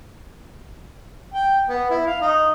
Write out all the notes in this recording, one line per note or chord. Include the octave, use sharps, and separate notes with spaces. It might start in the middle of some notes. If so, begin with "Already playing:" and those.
G5
B3
E4
F5
D#4